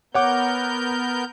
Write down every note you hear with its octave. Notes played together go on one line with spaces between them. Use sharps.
B3 A#4 C#5 F#5 D6 G6